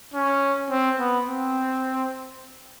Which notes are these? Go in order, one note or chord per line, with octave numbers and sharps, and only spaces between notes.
C#4
C4
B3
C4